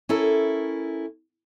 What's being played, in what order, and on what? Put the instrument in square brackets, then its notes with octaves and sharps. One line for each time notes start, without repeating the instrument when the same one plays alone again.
[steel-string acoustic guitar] C#4 E4 A4 A#4